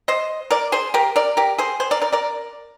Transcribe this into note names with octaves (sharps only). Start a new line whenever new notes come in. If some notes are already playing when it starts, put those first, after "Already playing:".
C5 D#5
A#4 D5
G#4 C5
G4 A#4
A#4 D5
G4 A#4
G#4 C5
G#4 C5
A#4 D5
A#4 D5
A#4 D5